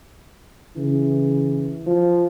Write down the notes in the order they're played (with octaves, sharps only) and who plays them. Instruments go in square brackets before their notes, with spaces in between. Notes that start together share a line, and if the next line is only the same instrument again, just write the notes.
[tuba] C#3 [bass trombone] E3
[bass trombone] F3